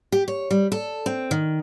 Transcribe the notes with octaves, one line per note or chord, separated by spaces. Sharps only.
G4
C#5
G3
A4
C4
D#3